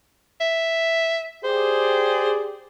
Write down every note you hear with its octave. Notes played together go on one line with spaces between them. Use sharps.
E5
G4 G#4 C5 D5